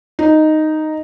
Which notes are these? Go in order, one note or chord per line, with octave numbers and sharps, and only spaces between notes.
D#4